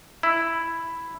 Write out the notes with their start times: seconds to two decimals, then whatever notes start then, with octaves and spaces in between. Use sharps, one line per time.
0.23 E4